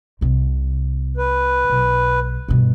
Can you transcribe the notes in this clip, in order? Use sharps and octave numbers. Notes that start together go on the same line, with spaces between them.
C2 C3
B4
B1
G2 B2